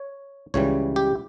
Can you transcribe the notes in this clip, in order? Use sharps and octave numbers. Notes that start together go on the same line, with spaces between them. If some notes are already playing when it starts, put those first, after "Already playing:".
Already playing: C#5
C#2 C#3 E3 G3 C#5
G4